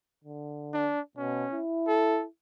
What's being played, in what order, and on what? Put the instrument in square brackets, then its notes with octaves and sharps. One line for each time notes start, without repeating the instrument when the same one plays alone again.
[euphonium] D3
[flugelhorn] D4
[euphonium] B2 [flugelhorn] C#4
[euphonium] E4
[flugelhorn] A4